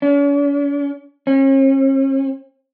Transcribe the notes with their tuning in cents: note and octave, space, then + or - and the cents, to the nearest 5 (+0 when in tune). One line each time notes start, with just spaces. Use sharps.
C#4 +45
C#4 -45